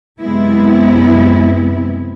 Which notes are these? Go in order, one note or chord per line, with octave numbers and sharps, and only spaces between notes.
F#2 C3 G#3 B3 C4 E4